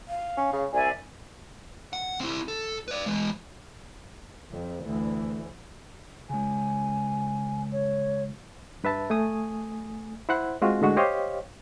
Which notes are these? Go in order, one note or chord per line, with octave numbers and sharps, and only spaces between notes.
F5
C#4
C#3
C2 D5 E5 G#5
F#5
C4 E4
A4
B4 D5
E3 G#3
F2
D2 E3
C#3 G#3 G#5
C#5
G2 B4 E5 A5
A3 G#5 D#6
E4 C5 F#5 F#6
G#3 C4 F4 F#4
A2 D3 G#3 F#4
G4 C5 C#5 D#5 F5